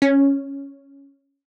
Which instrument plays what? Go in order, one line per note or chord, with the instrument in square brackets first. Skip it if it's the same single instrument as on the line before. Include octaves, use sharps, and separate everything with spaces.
[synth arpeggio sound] C#4